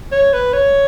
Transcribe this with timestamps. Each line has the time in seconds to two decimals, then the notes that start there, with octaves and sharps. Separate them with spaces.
0.12 C#5
0.33 B4
0.53 C#5